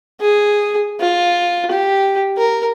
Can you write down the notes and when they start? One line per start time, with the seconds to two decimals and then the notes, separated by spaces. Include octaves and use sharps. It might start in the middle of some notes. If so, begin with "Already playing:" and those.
0.21 G#4
1.01 F4
1.71 G4
2.38 A#4